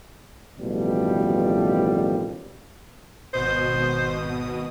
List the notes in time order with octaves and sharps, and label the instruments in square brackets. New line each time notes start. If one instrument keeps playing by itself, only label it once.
[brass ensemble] A1 F2 B2 D#3 F3 G3
[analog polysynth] G#1 B2 D#6 [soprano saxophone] C5